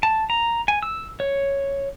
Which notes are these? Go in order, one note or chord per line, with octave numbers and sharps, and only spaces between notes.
A5
A#5
G#5
E6
C#5